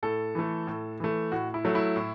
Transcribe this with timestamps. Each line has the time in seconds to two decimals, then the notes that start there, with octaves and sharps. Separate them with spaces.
0.03 A2 A4
0.35 E3 A3
0.67 A2
1.00 E3 A3
1.32 A2 F#4
1.54 E4
1.65 F#3 A3
1.75 E4
1.96 A2